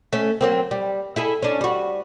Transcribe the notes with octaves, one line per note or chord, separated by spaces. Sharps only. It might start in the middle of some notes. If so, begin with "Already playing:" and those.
A3 C#4
F#3 A#3 C4
G3
E4 G#4 A4
C#4 D4
G3 F#4